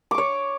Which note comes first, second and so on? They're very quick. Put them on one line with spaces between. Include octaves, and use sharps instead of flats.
D6 C#6 C#5